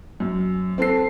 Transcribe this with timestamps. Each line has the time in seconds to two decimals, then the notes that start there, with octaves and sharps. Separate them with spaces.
0.20 F#2
0.78 C4 A4 C7